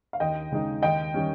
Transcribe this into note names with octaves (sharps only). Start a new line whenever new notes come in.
F5
D#2 D#5 G5
C#3 G#3 D#4
D#2 D#5 G5
D#3 G3 C#4